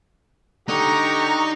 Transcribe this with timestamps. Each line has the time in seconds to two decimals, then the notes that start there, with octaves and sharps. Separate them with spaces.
0.69 D3 D#4 G4 A#5 C#6